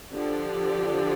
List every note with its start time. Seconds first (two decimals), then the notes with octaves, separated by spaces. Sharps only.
0.12 D3 F3 D4 G4 D5